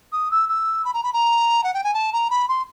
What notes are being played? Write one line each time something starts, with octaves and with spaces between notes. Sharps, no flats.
D#6
E6
E6
B5
A#5
B5
A#5
F#5
G5
G#5
A5
A#5
B5
C6